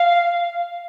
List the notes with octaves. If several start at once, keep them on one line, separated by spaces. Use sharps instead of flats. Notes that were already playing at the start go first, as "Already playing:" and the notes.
Already playing: F5